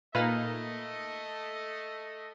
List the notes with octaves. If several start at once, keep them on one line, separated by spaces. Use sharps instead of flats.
A#2 A3 A#3 D#4 A4 B4 D#5 F5